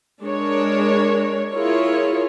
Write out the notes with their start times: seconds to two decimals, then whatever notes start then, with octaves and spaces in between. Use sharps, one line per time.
0.21 G#3 D4 A#4 C#5
1.53 E4 F4 G#4 A#4 C#5